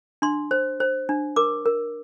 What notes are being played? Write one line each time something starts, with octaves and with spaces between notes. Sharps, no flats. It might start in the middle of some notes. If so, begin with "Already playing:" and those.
D4 C6
C5
C5
D4
A#4 D6
A#4